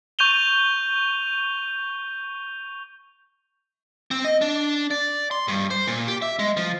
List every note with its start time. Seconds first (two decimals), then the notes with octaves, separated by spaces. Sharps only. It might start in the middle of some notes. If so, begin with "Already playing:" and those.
0.19 C#6 G6 D#7 F7 G7
4.11 C4
4.25 D#5
4.41 D4
4.91 D5
5.31 C6
5.48 G2
5.70 C5
5.87 A#2
6.08 G4
6.22 E5
6.39 G#3
6.57 F3